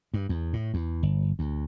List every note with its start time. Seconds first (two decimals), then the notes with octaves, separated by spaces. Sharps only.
0.14 G2
0.29 E2
0.53 A2
0.74 E2
1.03 G1
1.39 D2